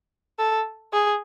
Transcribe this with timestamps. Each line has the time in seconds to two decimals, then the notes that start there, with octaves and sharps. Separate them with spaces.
0.39 A4
0.93 G#4